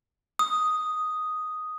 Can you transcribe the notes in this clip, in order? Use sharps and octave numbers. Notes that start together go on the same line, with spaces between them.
D#6